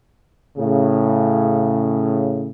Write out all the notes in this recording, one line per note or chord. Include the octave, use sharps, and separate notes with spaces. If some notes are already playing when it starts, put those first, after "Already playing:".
A2 C#3